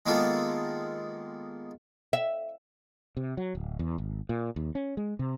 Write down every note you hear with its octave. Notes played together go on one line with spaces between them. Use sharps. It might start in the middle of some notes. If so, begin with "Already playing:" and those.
D#3 G#3 A#3 B3 F4 A4
E5
C3
F#3
D1
E2
G#1
A#2
D#2
C#4
G#3
C3